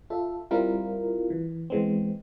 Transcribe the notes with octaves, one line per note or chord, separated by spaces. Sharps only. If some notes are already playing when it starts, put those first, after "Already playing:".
F4 A4 E5
G3 C4 E4 F4 A#4
E3
E3 G#3 B3 C4